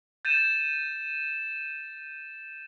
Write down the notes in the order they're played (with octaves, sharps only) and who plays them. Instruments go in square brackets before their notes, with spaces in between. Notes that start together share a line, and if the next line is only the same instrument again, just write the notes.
[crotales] G6 A6 D#7 E7